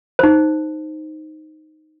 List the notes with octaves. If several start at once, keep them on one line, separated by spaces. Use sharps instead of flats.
D#4 C5